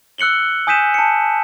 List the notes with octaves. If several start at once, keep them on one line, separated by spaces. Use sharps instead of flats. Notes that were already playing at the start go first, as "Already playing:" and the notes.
E6 F#6 C#7 F#7 G7
G#5 D#6 G6 B6 D#7 E7
A5 C#7